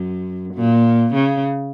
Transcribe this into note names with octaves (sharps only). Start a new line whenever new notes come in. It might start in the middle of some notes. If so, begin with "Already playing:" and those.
Already playing: F#2
A#2
C#3